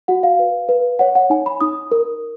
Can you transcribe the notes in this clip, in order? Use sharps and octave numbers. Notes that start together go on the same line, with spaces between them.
F#4 F#5
F5
B4
B4
C#5 F#5
F#5
D#4 G#5
B5
D#4 D#6
A#4